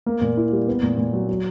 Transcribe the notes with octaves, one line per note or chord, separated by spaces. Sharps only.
A#3
A#2
E4
G3
B3
A#2
A#2
F#3
F#3